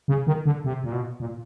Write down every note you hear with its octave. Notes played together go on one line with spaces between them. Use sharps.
C#3
D#3
D3
C3
A#2
B2
A#2